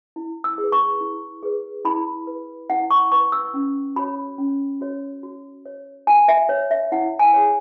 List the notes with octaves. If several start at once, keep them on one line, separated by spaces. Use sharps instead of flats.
E4
E6
G#4
B4
C#6
E4
G#4 B4
E4 B5
B4
E4 F#5
C#6
B4 C#6
E6
C#4
F#4 C#5 B5
C#4
F#4 C#5
F#4
C#5
F#4 G#5
E5
C#5
E5
E4 F#5
G#5
G#4 C#5